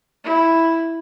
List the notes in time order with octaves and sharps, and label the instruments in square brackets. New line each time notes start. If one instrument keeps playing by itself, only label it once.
[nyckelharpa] E4